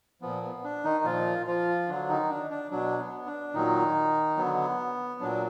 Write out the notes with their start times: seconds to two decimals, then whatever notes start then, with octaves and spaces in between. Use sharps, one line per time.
0.22 A#2 F3 B3
0.43 B3
0.64 D4
0.84 D#3 D#4
1.05 A#2 F3 F4
1.46 F3 F4
1.88 D3 F#3 D4
2.09 D#3 D#4
2.30 D4
2.51 D4
2.71 B2 F#3 D4
2.99 B3
3.26 D4
3.54 A#2 D#3 F#3 D#4
4.37 D3 F#3 B3
5.20 A#2 F#3 D4